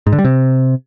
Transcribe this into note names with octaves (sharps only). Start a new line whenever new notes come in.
G#2
D3
G3
C3